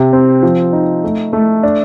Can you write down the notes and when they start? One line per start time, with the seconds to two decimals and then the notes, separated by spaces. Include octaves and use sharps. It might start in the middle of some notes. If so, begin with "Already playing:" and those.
Already playing: C3
0.13 C4
0.43 F3
0.73 D#4
1.04 A3
1.33 A3
1.63 D4